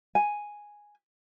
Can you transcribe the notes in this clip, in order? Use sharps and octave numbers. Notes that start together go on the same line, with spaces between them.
G#5